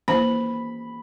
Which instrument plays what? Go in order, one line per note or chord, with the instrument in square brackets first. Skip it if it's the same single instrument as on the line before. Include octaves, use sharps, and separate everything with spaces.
[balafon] A#3 C5 [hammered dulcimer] B5